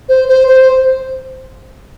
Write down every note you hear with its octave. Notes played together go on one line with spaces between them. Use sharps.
C5
C5
C5